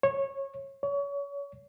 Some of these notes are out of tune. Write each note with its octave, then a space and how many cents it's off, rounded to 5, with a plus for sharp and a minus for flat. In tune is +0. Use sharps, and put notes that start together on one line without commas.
C#5 -20
C#5 +30